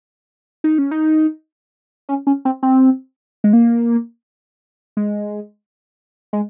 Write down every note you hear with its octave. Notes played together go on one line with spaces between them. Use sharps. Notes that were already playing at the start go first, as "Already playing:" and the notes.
D#4
C#4
D#4
C#4
C#4
C4
C4
G#3
A#3
G#3
G#3